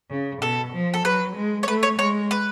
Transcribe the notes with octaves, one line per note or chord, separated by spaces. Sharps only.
C#3
B2 A4
F3
A4
F#3 B4
G#3
C#5
A3 B4
C#5
G#3 C#5
B4